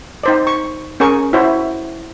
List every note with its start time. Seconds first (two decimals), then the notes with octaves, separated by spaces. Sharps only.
0.24 D#4 C5 D5
0.47 C#6
1.00 C#4 G#4 A#4 C#6
1.33 E4 F#4 C5 C#5 E5